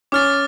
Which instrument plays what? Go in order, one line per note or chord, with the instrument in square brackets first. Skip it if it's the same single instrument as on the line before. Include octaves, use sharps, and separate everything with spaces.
[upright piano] C#4 [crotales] D6 F6 A6